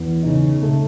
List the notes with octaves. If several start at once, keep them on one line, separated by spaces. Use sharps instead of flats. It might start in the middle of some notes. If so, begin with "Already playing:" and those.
Already playing: E2
C#3 D#4
A3